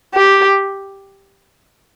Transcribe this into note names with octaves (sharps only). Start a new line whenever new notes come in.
G4